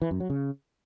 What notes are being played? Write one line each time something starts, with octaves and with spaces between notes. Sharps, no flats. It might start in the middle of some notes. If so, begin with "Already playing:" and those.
E3
F#2
F#3
C#3